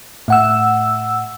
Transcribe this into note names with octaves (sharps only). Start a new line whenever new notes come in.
A2 F#5 E6